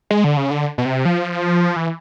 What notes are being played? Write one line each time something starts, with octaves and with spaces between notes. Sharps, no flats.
G#3
D3
C#3
D3
B2
C3
F3
E3